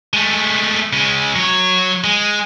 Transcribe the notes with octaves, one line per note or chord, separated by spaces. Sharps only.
G#3 A3
C#3 G#3
F#3 C#5
G#3